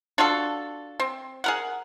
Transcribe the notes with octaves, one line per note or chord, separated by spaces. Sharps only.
D4 F4 F#4 A4
C4
G#4 A#4 F#5